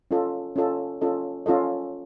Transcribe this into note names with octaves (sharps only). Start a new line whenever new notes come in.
C#4 F4 A4 D#5
C#4 F4 A4 D#5
C#4 F4 A4 D#5
C#4 F4 A4 D#5